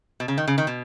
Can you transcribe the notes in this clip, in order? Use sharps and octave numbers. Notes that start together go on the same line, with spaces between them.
B2
C#3
D#3
C#3
D#3
B2